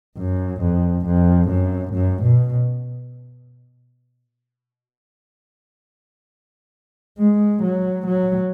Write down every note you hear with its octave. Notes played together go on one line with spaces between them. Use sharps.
F#2
F2
F2
F#2
F#2
B2
G#3
F#3
F#3